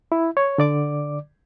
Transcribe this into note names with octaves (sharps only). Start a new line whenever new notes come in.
E4
C#5
D3 D5 D6